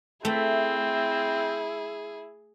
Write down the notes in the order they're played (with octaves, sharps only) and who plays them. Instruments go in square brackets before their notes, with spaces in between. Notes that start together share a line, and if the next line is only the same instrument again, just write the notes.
[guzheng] A3 [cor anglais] C4 [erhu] E4 [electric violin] G#4